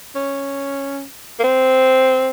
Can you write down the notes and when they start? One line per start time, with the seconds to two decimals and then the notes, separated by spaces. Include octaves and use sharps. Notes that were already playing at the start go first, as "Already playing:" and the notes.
0.15 C#4
1.39 A#3
1.43 C4